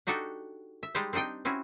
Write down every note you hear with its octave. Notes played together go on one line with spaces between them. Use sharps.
D4 D#4 F#4 G4 A4
E5
G3 G#3 D#4 G4 C5
C4 D4 D#4 D#5 G5
C4 C#4 E4 F#4